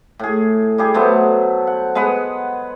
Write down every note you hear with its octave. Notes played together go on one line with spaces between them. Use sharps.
A2 G#4
G3 G4 G#4
F#3 A3 B3 C5
F#5
G#3 B3 B4 F#5